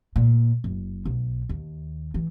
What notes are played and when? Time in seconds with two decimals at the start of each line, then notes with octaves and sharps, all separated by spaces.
0.16 A#2
0.64 F#1
1.05 B1
1.49 D#2
2.14 E3